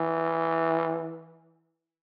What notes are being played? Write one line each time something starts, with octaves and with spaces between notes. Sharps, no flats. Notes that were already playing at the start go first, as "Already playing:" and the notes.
Already playing: E3